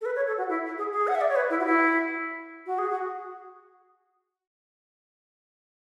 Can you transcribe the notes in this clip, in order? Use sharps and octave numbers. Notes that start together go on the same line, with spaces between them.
A4
B4
C#5
A4
F#4
E4
G#4
G#4
F#5
E5
D5
C#5
B4
E4
F#4
E4
F#4
G#4
F#4